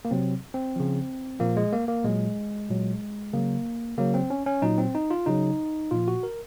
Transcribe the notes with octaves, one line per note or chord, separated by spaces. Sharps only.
A#3
C3 F#3 C4
C4
C#3 F3
A#2 F3 A#3
G#3
A#3
A#3
A#2 F#3 G#3
A#2 F#3
C#3 F#3 A#3
C#3 F#3 A#3
C4
C#4
C#4
A#2 F#3 D#4
C4
D#4
F4
C#3 F#3 D#4
A#2 F3 F4
F#4
A#4